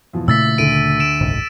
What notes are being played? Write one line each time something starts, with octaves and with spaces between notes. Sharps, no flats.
E2 B2 F3
A#2 C#3 A3 E4 E5 E6 A6 B6
D2 D3 D7 D#7
D7 E7
F#1 C2 G#2